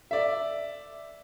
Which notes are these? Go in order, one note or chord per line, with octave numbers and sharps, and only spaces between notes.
D5 E5